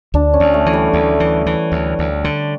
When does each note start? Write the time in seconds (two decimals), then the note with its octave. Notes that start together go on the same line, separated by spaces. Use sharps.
0.14 D2 D4
0.34 C#4
0.40 D2
0.54 A3
0.66 E3
0.73 G3
0.93 D2
1.20 E3
1.46 E3
1.72 D2
1.99 D2
2.24 D3